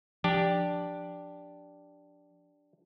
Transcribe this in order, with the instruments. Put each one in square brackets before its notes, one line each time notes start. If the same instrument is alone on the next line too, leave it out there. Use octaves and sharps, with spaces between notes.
[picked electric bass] F3 [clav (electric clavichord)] D4 G4